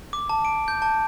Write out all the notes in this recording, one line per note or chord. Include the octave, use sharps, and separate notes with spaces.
D6
A5
D7
G6
A5